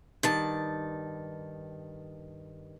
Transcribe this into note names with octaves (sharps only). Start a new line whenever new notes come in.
G2 D#3 A5